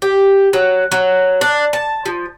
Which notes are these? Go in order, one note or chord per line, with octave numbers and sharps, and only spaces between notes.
G4
F#3
F#3
D4
A5
F3